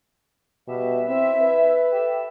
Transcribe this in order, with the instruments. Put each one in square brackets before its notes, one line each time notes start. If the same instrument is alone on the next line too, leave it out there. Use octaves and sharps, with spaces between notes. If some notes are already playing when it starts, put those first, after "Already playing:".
[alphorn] B2 [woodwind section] G3 B4 E5
[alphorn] C4 [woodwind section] E4 E5
[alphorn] B4
[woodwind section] G4 A4 E5